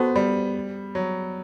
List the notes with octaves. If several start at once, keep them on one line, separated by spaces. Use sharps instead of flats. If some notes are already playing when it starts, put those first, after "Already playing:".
Already playing: B3 F#4 A4 C5
G3
F#3